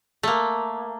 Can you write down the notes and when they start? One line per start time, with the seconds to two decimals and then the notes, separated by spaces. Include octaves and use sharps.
0.23 A3 A#3